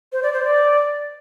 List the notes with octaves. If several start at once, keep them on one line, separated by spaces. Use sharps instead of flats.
C5
D5
C5
D5